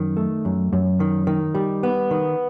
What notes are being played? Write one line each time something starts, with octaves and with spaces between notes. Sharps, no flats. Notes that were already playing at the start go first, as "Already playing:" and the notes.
Already playing: F#2 D#3
A3
F#2
F#2
D#3
D#3
G3
B3
D#3